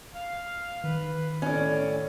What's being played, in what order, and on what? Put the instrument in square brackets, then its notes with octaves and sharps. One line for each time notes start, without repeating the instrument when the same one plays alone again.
[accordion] F5
[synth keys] D#3 [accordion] B4
[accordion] A2 [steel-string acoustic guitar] C#4 D5